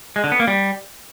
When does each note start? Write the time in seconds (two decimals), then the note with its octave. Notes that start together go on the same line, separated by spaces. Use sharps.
0.16 G#3
0.24 D3
0.32 B3
0.40 A#3
0.48 G3